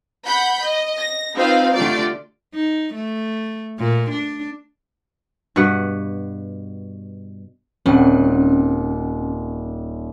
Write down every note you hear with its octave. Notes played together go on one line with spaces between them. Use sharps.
F#5 B5 G6
D#5
A#6
C4 D#4 F4 B4 C5 F5
D3 A3 F4 G4 D5
D#4
A3
A#2
D4
G2 B2 B4 F#5
D#1 C4 C#4 G5